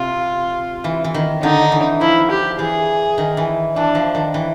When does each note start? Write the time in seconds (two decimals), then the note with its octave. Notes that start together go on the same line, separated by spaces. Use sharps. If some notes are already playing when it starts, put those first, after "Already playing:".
Already playing: C3 F4
0.84 E3
1.04 E3
1.14 D#3
1.42 D3 D#4
1.72 E3
2.01 F3 E4
2.31 G4
2.59 E3 G#4
3.18 D#3
3.37 E3
3.76 E3 D4
3.95 F3
4.15 D#3
4.34 E3